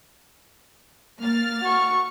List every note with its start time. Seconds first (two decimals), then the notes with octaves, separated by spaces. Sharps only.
1.21 A#3 F6 A6
1.61 F#4 C#6